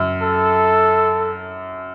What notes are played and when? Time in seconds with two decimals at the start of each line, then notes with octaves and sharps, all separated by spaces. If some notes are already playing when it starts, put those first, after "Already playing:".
Already playing: F#2
0.22 A4